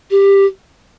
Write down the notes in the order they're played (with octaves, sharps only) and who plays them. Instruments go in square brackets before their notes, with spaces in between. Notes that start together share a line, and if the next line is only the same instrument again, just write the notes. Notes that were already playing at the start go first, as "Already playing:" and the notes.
[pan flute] G4